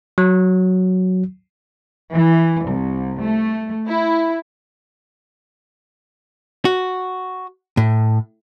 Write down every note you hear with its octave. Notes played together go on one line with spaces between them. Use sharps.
F#3
E3
C2
A3
E4
F#4
A2